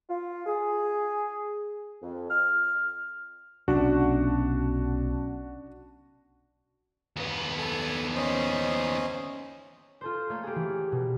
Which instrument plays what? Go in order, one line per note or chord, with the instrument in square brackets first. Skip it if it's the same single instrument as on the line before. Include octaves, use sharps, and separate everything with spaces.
[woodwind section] F4
G#4
F2
F6
[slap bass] B1 C3 [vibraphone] C#4 F#5 A5 [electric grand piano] D4 F#4
[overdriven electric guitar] D#2 B3
[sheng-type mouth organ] A4 G#5
C#4 C5 D#5
[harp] F4 A4 C5
A3 A#3 A4 C#5 F5
G4 G#4
E3
B2